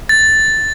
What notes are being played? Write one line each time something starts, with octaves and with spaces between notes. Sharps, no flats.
A6